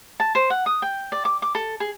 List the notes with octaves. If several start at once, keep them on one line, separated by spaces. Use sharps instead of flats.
A5
C5
F#5
D#6
G5
D5
D6
D6
A4
G#4